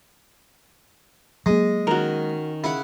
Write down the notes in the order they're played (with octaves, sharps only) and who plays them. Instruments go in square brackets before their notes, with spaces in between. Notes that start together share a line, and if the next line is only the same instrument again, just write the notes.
[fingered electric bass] F#3 A#3 [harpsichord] G#3
[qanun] D#3 C#4 [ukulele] F#4 A#4
[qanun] C#3 F#5 [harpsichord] E4